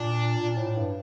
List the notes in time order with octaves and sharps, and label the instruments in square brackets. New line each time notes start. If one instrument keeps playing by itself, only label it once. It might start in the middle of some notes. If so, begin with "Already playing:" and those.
Already playing: [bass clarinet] A#2 [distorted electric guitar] D4
[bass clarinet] A#2
A2
G2